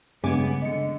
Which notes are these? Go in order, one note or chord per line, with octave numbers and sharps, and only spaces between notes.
G2 C#3 G#3 B3 G#5 D6
D3 D#5 C#7